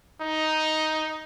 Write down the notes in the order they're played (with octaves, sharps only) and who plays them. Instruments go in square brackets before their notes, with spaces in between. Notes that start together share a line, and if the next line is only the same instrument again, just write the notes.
[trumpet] D#4